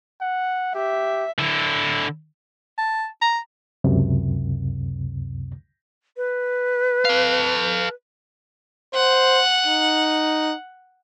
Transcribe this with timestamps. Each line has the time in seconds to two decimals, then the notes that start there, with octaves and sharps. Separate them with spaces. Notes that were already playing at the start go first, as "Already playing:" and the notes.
0.21 F#5
0.75 G4 E5
1.38 D3 E4
2.78 A5
3.21 A#5
3.84 C#2 F#2 C3
6.17 B4
7.05 A4 F5
8.94 C5 F#5
9.67 D#4